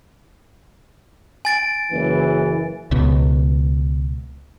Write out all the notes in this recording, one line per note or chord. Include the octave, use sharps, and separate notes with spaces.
G#5 A6 D7
F#1 E3
C#2 B2